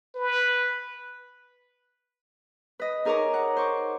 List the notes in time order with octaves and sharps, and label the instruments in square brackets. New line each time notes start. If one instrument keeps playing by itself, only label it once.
[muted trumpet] B4
[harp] B4 D#5
D#4 G#4 A#4 C#5 A#5 D6
F#5
C5 C#6 D6